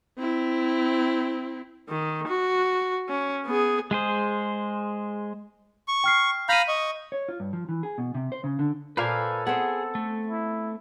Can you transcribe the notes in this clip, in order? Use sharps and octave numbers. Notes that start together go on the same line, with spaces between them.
C4 E4
D#3
F#4
C#4
B3 G#4
G#3 G#4 C5
C#6
G5 F6 C7
F5 A#5 B5 G6 D#7
D#5 C#6
C#5
F4
G2
F3
E3
G#4
B2
C3
C5
C#3
D3
A#2 A#3 A4 B4 C5 F5 G#5
B3 C4 G#4
A3
E4